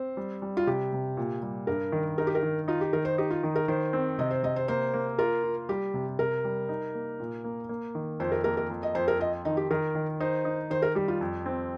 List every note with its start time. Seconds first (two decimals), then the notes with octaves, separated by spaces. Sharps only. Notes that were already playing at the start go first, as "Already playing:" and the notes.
Already playing: C4 C5
0.17 G3
0.42 G3
0.57 F4
0.67 C3 G4
0.93 C3
1.17 A#2
1.43 G3
1.67 G2 A#4
1.92 D#3
2.18 D#4 A#4
2.27 G4
2.35 A#4
2.43 D#3
2.68 D#4 F4
2.81 G4
2.93 D#3 A#4
3.05 C5
3.18 D#4 G4
3.31 F4
3.43 D#3
3.56 A#4
3.68 D#3 C5
3.93 C4
4.19 C3 D#5
4.31 C5
4.43 C3 D#5
4.56 C5
4.68 A#3 C5
4.94 A#3
5.19 F4 A#4
5.43 F4
5.69 G3 G4
5.94 C3
6.19 C3 A#4
6.45 G3
6.69 D#4
6.94 A#3
7.20 A#2
7.44 A#3
7.69 A#3
7.95 D#3
8.20 F2 C5
8.32 A#4
8.44 A#3 A#4
8.57 A#4
8.70 F2
8.83 D#5
8.95 F2 C5
9.08 A#4
9.20 F4 D#5
9.45 D#3 D#4
9.57 G4
9.71 D#3 A#4
9.95 D#3
10.20 D#4 C5
10.45 D#4
10.70 D#3 C5
10.82 A#4
10.95 G3 G4
11.08 F4
11.21 F2
11.46 C4